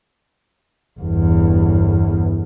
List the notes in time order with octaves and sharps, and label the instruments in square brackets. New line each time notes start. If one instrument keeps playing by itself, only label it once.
[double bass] G1 E2